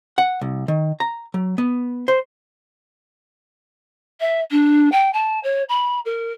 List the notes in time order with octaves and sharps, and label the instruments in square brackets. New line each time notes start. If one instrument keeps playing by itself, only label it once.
[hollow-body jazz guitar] F#5
C2
D#3
A#5
F#3
B3
C5
[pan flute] E5
D4
G5
A5
C#5
B5
A#4